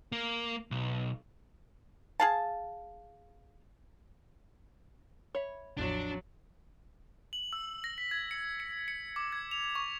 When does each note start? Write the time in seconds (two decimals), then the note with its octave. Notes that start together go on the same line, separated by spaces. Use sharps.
0.12 A#3
0.71 B1
2.20 G#4 F5 A5
5.35 C#5 E5 B5
5.77 A1 E2 A2 F3 F#3 D4
7.33 F#7
7.53 E6
7.84 A#6
7.98 B6
8.11 G#6
8.31 C#7
8.60 C#7
8.88 C#7
9.16 D6
9.32 G#6
9.51 F7
9.75 C#6